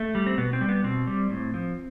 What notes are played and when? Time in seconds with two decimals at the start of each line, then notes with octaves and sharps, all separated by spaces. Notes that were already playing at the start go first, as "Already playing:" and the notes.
Already playing: A3
0.15 G3
0.27 C4
0.38 B2 B3
0.53 C4
0.61 G3
0.69 B3
0.84 B2 C4
1.07 G3
1.31 A2
1.54 F3